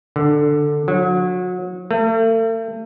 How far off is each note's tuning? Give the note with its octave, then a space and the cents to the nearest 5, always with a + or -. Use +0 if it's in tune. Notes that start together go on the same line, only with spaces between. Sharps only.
D3 +5
F#3 -30
A3 +40